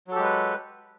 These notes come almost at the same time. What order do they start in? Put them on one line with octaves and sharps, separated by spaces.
F#3 A4 G4 G#3 B4